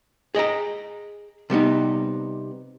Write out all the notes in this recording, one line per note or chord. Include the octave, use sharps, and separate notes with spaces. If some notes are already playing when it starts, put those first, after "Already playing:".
G#4 D#5 G5 A#5
C3 G3 B3 D#4